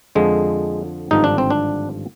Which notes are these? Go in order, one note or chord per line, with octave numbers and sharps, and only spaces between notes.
F2 D3 F3 G#3
G#1 G2 D3 F3 D#4
D4
C4
D4